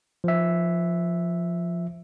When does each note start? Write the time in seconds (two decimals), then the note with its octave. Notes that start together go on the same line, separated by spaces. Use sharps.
0.24 F3 E5